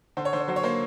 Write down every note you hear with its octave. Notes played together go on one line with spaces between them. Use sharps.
D3 C5
C#5
D3 C5
C#5
F#3 C5
C#5
A#3 C5